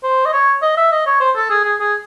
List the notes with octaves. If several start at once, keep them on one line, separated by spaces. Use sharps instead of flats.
C5
D#5
C#5
D#5
E5
D#5
C#5
C5
A4
G#4
G#4
G#4